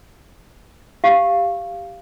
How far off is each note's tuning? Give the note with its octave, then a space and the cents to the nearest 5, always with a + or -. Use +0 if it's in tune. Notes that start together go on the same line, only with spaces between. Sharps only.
G4 +0 F5 -10